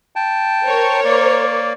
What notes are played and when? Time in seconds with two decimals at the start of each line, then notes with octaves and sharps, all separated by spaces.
0.16 G5 A5
0.64 A#4 C5 C#5
1.05 A#3 D5